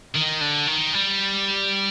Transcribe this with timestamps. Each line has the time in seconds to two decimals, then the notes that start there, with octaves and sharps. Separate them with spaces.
0.15 D#3
0.41 D3
0.67 D#3
0.94 G3